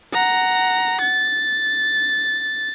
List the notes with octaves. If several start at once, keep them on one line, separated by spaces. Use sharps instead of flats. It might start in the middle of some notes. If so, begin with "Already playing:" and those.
F#5 A#5
A6